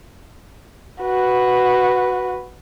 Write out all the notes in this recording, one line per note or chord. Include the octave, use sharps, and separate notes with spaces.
F#4 B4